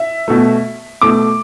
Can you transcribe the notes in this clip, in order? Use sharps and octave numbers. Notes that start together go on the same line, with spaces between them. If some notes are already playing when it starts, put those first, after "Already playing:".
Already playing: E5
B2 A3
B2 A3 D6